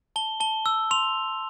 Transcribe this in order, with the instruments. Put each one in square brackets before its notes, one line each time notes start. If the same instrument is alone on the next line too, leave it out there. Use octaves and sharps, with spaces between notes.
[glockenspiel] A5 G7
A5 G7
E6
C6 F7